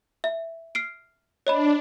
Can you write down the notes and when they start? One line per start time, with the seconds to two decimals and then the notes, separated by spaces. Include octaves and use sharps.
0.24 E5
0.75 F6 C7 D7
1.47 D4 C#5 D#5 B5